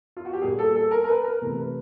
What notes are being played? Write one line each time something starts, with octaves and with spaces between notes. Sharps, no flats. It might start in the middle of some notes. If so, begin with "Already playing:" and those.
F4
F#4
G4
A#2 G3 A#3 G#4
A4
A4
A#4
A#4
B4
A#4
C3 E3 A3
B4